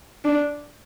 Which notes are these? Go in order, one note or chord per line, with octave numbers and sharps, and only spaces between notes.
D4